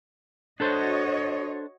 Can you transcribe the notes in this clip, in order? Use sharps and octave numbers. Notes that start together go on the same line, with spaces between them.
D4 F#4 A4 C5 C#5 D#5